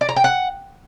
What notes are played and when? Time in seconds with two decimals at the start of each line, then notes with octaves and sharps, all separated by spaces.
0.01 D5
0.09 A#5
0.16 G5
0.24 F#5